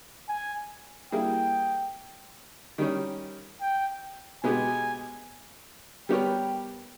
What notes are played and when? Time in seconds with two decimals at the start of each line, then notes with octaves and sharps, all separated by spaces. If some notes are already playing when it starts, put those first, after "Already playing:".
0.29 G#5
1.12 G3 A#3 E4 G#4 G5
2.78 D#3 G3 C#4
3.61 G5
4.44 B2 G#3 B3 G4 G#5
6.09 G3 B3 G4 A#4 C#5 G5